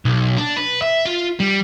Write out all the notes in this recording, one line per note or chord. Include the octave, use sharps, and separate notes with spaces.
B1
D4
B4
E5
F4
G3